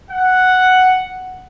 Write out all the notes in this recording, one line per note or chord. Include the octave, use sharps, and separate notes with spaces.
F#5